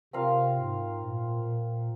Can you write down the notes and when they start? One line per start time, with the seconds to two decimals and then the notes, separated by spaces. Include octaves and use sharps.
0.13 C3 C4 F4 A#4 F5
0.57 G#2
1.01 A#2
1.44 A#2